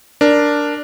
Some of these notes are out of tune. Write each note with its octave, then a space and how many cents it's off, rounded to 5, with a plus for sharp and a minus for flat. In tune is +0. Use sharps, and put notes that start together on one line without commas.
D4 +0 A#4 +0